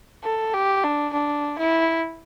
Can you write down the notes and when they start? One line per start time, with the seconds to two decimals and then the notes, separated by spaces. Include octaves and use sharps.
0.23 A4
0.53 G4
0.84 D4
1.13 D4
1.58 E4